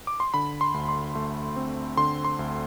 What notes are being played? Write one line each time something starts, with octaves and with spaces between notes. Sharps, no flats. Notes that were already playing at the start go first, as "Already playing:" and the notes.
D6
C6
D3 B5
C6
D2
C6
A3
C4
D3 C6
C6
D2